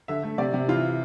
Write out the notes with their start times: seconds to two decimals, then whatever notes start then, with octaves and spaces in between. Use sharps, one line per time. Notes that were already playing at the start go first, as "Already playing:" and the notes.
0.08 D3 E5
0.23 A3
0.38 C3 D5
0.53 C3
0.68 E3 F4